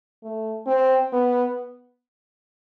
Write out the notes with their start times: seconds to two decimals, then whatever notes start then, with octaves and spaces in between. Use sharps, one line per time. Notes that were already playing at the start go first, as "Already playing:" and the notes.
0.23 A3
0.67 C4
1.13 B3